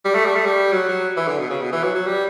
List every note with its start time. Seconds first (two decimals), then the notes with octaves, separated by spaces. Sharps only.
0.05 G3
0.14 A3
0.26 G3
0.36 A3
0.45 G3
0.72 F#3
0.88 F#3
1.16 E3
1.28 D3
1.38 B2
1.50 C#3
1.62 B2
1.73 E3
1.83 F#3
1.95 F#3
2.06 G3